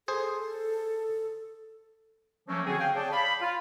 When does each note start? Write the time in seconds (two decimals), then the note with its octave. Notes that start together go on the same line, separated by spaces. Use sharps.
0.08 G#4 A4 C5
2.48 F3 F#3 A3 A#3 C#4
2.65 D3 C4 F#4 G#4
2.79 F5 G5
2.95 G#4 C#5 D5 G5 A5
3.12 F5 B5
3.41 F4